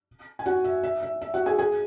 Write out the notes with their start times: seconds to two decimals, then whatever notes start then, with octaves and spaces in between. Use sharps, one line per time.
0.39 G#5
0.46 F#4 F#5
0.64 E5
0.83 E5
1.03 E5
1.21 E5
1.34 F#4 F#5
1.46 G#4 G#5
1.59 G#4 G#5